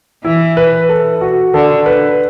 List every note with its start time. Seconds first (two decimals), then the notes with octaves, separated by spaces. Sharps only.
0.24 E3 E4
0.57 B4
0.89 A4
1.21 F#4
1.54 D3 A4
1.86 B4